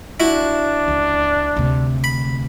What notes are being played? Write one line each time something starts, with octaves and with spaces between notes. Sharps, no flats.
D4 E4 F#4
C#2
D2 C3
B5